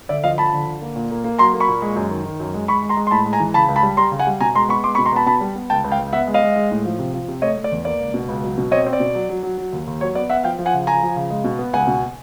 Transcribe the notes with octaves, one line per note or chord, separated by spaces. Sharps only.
D3 D5 E5
F3 D#5 F5
F3 A5 B5
D3
D3
A#3
A#2
A#3
A#3
F#3 A#5 C6
A#3
B5 C#6
A#2
G#3
F#2
D#3
D#3
F#2
G#3
G#3 B5 C#6
G#3
A#5 C6
G#3
C6
A2 A5 B5
G#3
G#5 A#5
E3
C#3 A5 B5
C#2
A5 B5
G3
G3 A#5 C6
C#3
F#5 G#5
G3
B2 G#5 A#5
G#3 A#5 C6
B3 B5 C#6
G#3 C6 D6
B5 C#6
B2
A#5 C6
B3 A5 B5
B2 A5 B5
G3
B3
C#2 G5 A5
C#2
F5 G5
C#2
B3 E5 F#5
G#3
D#5 F5
G#3
G#3
A2
F3
C3
F3
C3
A3 C#5 D#5
A3
D5
E2
A#3 D5
C#2
B2
C#2
F#3
B2
C4 C#5 D#5
C4
D5
B2
F#3
F#3
F#3
F#3
D#2
D#2
F#3 C#5
B3 D5
B3 E5 F#5
F3 F5 G5
F3
F#5 G#5
C#3
F3 G#5 A#5
F3
C#3
G#3
B2
B3
C#2 F#5 G#5
B2